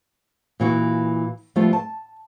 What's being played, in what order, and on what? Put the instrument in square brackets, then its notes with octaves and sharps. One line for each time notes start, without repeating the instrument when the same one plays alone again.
[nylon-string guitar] A#2 E3 F#4
F3 G3 A3 B3 F4
A5